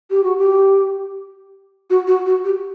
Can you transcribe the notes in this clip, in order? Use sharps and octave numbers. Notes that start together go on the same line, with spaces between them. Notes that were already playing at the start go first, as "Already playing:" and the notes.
G4
F#4
G4
F#4
F#4
F#4
G4